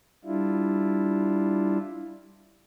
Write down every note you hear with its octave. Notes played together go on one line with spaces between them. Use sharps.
G3 D4 E4 F4